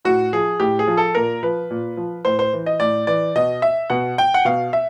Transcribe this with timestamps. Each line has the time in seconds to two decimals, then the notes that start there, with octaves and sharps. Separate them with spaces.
0.05 A2 F#4
0.33 F3 G#4
0.60 A2 G4
0.79 G#4
0.87 F3
0.97 A4
1.15 A#2 A#4
1.43 F3 B4
1.70 A#2
1.97 F3
2.25 A2 C5
2.39 C5
2.53 E3
2.66 D#5
2.80 A2 D5
3.07 E3 D5
3.36 B2 D#5
3.62 E5
3.90 B2 F#5
4.18 G5
4.34 F#5
4.45 B2 F5
4.73 E5